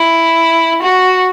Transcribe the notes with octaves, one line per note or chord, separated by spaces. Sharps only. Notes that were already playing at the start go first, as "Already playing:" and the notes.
Already playing: E4
F#4